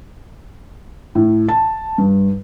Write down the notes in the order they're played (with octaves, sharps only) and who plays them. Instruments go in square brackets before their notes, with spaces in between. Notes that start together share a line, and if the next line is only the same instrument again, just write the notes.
[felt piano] A2
A5
G2